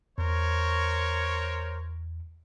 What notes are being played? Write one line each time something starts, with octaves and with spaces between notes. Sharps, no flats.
E2 A#4 C5 C#5